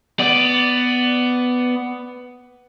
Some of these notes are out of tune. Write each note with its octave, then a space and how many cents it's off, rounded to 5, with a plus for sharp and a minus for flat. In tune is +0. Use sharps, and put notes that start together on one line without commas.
B3 +10 D5 +0